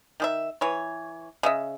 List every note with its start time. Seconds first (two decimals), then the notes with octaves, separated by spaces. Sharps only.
0.20 D#3 G4 E5
0.61 E3 C#5
1.43 C#3 D#5 E5